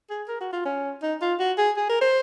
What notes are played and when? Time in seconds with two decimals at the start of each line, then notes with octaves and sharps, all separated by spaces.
0.10 G#4
0.28 A#4
0.40 F#4
0.52 F4
0.65 C#4
1.02 D#4
1.21 F4
1.39 F#4
1.58 G#4
1.77 G#4
1.89 A#4
2.01 C5